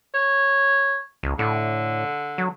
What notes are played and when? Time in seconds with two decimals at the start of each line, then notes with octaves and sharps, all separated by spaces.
0.14 C#5
1.23 C#2
1.39 A2 D3
2.38 F#3